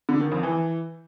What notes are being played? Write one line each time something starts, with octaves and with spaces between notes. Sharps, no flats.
D3
D#3
F2
E3